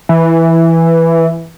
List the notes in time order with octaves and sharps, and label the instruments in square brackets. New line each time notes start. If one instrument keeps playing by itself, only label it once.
[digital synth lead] E3